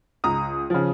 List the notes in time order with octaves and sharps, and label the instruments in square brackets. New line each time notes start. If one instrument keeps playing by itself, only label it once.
[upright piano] C#2 A#5 D#6
C#3 F3